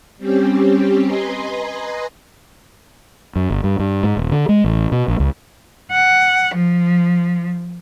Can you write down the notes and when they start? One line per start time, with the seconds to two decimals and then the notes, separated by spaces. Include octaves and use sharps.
0.17 G3 C4 C#4 G4
1.05 B4 D#5 G#5 A#5 C6
3.36 F#2
3.50 G1
3.64 G2
3.79 G2
4.03 G#2
4.17 D#1
4.31 D3
4.49 G#3
4.64 A1
4.92 B2
5.08 A#1
5.20 C#2
5.92 F#5
6.55 F3